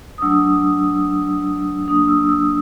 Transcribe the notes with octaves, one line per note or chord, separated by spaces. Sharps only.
D#6
F#3 A3 D4 E6
F#3 A#3 D4 D#6
E6
E6